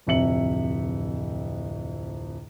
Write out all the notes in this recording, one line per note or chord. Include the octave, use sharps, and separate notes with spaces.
D1 F2 C3 E5 C#7 F#7